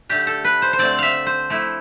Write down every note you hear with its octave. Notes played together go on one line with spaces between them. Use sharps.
D3 A3 D4 G4
A4
B4
C5
C5
D3 A3 C4 D5
E5 F5
C5
F3 A3 E4